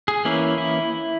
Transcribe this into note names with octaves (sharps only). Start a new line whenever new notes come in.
G#4
E3 A#3 C#4 E4
E4